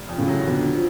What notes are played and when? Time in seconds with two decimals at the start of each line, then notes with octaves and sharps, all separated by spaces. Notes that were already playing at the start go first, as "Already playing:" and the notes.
Already playing: F1
0.09 F2
0.18 A2 C#3
0.27 F#3
0.46 F2 B2 D3
0.74 F3